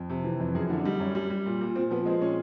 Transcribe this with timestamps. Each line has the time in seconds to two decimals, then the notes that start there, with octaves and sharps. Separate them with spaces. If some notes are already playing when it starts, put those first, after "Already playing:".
Already playing: F2
0.10 C3
0.24 E3
0.40 F2
0.55 F#2 G#4
0.70 D3 E4
0.79 D4
0.85 G3 D#4
0.99 F#2 C#4
1.15 G3
1.30 G3
1.46 A#2
1.61 A#2
1.75 A#2 C4
1.91 F3 B3
2.06 G#3 C4
2.21 A#2 C#4